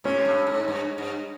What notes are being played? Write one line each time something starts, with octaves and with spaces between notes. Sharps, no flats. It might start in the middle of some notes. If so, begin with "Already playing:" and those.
C3 C#4
G2
G#2
G2
G2